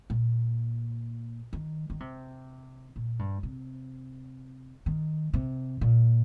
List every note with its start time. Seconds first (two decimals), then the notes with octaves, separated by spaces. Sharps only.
0.10 A#2
1.53 D#3
1.90 D#3
2.00 C3
2.96 A#2
3.19 G2
3.43 C3
4.86 D#3
5.34 C3
5.81 A#2